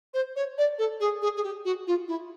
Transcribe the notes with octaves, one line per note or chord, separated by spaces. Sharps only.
C5
C#5
D5
A4
G#4
G#4
G#4
G4
F#4
F4
E4